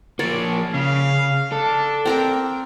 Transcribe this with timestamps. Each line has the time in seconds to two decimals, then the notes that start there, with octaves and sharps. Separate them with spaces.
0.19 F3 A#3 C#5 D5
0.74 C#3 F5
1.52 D4 A4
2.05 C4 A#4 G5